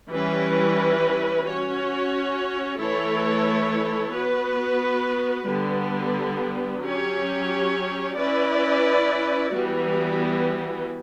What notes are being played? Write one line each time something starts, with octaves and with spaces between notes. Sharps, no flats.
E3 G3 C#4 E4 B4
C#4 F#4 C#5
E3 A3 E4 A4 C#5
B3 F#4 B4
D3 G3 B3
F#3 C#4 G4 C#5
C#4 E4 B4 D5
E3 G3 B3 F#4